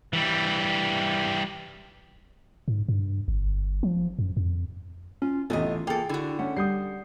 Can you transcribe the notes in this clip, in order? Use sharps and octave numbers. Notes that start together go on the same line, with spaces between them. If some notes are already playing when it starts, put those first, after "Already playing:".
E3 G3
G#2
G2
G1
F3
F#2
F2
C#4 F4
A1 C3 G3 A3 B3 F4 D#5 G#5
A#3 G#4 A4 G5
D3 E4 F#4
A3 C#4 F#5
G3 D#6 G6 C7